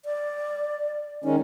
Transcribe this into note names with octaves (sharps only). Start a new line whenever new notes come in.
D5
D#3 G#3 C#4 D#4